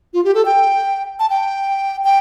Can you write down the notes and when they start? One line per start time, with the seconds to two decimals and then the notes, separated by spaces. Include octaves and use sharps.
0.14 F4
0.24 G4
0.35 A4
0.45 G5
1.20 A5
1.30 G5
2.04 G5